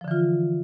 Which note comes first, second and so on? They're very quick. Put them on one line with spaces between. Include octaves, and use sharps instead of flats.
F3 D3 E3 F4